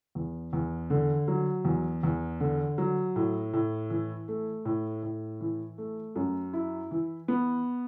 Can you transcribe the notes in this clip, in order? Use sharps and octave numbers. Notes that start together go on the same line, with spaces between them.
E2
E2
D3
F#3
E2
E2
D3
F#3
A2
A2
E3
A3
A2
A2
E3
A3
F#2
E4
E3
B3